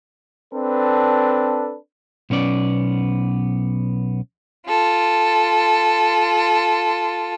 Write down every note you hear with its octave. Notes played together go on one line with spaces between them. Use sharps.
C4 D4 A4 B4
B1 B3 C#4 D5
F4 A4